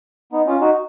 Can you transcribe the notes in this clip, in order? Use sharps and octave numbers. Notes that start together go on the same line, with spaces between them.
B3 D#4
C#4 F4
D#4 F#4